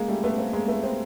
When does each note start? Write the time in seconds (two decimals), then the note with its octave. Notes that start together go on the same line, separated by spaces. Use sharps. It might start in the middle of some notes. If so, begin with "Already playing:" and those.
Already playing: G#3 A#3
0.08 G3 A3
0.24 A3 B3
0.38 A#3 C4
0.53 G#3 A#3
0.68 A3 B3
0.83 A#3 C4